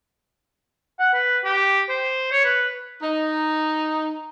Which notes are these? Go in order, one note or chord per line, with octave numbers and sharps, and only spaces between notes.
F#5
B4
G4
C5
C#5
B4
D#4